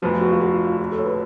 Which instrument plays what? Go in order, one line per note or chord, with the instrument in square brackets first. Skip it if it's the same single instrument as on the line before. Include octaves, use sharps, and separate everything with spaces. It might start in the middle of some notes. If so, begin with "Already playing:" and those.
[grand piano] F1 F2 F3 B3 [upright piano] F#4
[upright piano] F4
F#4
F4
F#4
F4
F4
F#4
A4
C#5
B4